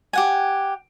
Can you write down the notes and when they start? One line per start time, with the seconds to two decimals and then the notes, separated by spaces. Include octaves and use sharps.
0.13 G4 F#5 G#5